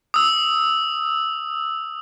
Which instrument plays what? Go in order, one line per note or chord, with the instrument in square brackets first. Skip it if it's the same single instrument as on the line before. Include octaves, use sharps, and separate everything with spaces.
[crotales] D#6 E6